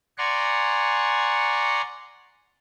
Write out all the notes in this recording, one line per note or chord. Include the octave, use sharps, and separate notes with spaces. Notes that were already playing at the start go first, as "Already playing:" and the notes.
D5 F#5 G#5 A#5 C6 C#6